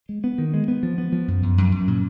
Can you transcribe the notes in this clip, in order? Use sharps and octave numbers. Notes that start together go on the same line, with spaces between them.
G#3
B3
D#3
G#3
B3
F3
B3
F3
F#2
F#2
F#2
F#2
A#2